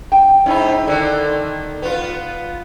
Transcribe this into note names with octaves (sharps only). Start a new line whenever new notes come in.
G5
G#2 C#4 D#4 E4
D3 D#3 A4
B3 F4